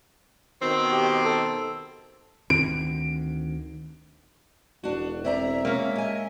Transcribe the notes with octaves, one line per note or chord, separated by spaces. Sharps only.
B2 D#3 C4
G4
A4
D2 D#3 C4 D7
E1 D4 F#4
C4 D5 E5 A#5
G#3 A#3 C#4
D#5 G#5